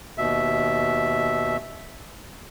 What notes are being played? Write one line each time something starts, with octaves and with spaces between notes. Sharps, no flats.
D#2 B2 E5